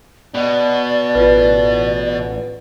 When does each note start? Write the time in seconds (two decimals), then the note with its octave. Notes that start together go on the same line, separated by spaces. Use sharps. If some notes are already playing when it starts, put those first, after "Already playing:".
0.34 B2 D5
1.15 A1 F4 B4